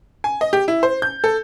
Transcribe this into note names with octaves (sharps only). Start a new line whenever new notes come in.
G#5
D#5
G4
E4
C5
G6
A4